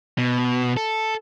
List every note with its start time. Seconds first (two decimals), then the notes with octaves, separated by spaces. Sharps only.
0.18 B2
0.77 A4